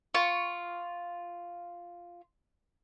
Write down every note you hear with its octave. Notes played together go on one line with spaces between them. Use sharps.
F4 C#6